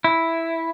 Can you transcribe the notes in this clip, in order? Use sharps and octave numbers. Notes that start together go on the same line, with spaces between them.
E4